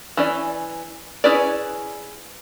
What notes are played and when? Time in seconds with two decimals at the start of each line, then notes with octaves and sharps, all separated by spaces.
0.17 E3 C#4 D5
1.24 C#4 E4 G#4 B4 D5